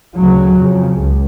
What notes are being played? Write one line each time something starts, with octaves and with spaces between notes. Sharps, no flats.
D2 C#3 F#3
F2 C#3
C#2